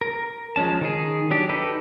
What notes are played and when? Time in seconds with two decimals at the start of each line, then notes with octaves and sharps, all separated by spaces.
0.01 A#4
0.56 F3 G#3 C#4 A5
0.81 D#3 D#4 G#4
1.31 F#3 D4 G4
1.49 D#4 G4 A4 B4